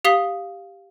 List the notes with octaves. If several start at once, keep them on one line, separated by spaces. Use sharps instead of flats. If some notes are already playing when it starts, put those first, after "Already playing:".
G4 F5 D#6 B6 G7